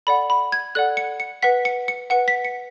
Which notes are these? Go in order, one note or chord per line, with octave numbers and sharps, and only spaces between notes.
A4 D5 F#5 B5
B5
G#6
A4 D5 F#5 F#6
C#7
C#7
B4 F#5 B6
C#7
C#7
B4 F#5 C#7
B6
C#7